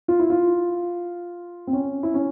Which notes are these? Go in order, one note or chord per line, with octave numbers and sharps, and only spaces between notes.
F4
E4
F4
C4
C#4
E4
C#4